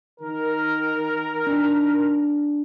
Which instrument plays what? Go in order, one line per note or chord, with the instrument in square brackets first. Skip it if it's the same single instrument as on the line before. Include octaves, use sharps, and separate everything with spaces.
[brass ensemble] D#3 A#4
[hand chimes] D4